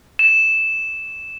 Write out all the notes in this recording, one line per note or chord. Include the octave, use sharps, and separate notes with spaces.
E7